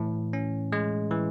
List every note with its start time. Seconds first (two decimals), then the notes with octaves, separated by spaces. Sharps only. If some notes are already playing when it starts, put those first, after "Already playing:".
Already playing: A2 E3
0.33 C#4
0.72 G#3
1.11 E3